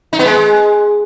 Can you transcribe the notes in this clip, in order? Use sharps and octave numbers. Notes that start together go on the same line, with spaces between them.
D#4
B3
G#3